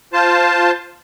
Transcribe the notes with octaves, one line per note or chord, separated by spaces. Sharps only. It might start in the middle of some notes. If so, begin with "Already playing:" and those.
F4 C5 A5